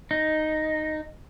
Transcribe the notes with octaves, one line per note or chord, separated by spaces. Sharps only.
D#4